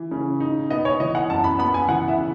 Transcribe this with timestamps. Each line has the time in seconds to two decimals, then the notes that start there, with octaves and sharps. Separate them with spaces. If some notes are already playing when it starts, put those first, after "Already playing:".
Already playing: E3
0.11 C#3
0.40 D#4
0.70 B3 D#5
0.85 C#5
1.00 E3 D#5
1.15 F#5
1.30 F#2 A5
1.44 B5
1.59 B3 B5
1.74 G#5
1.88 E3 F#5
2.08 E5
2.18 C#3